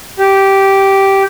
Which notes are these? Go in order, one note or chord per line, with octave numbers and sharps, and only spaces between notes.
G4